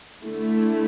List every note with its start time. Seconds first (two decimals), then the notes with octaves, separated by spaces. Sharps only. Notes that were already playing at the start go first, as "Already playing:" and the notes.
0.23 D3 A3 E4